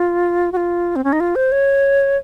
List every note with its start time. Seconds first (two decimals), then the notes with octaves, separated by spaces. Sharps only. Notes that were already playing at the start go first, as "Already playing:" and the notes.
Already playing: F4
0.52 F#4
0.57 F4
0.96 C4
1.04 C#4
1.13 D#4
1.20 F4
1.36 C5
1.52 C#5